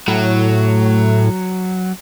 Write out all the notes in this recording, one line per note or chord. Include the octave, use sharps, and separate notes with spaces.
A2 F#3